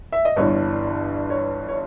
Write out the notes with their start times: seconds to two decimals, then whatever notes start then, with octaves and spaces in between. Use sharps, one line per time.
0.13 E5
0.25 D#5
0.36 G1 G2 E3 C#5
1.30 C#5
1.68 C#5